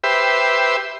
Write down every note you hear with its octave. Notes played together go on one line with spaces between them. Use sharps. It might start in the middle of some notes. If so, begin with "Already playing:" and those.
G4 B4 C5 E5